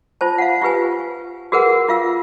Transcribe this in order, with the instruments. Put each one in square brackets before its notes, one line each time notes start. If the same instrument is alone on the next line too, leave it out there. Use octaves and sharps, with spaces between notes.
[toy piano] F4 C5 A5
F5 F#5
F4 G4 B4 G#5
F#4 G#4 A#4 B4 F#5
F4 F5 E6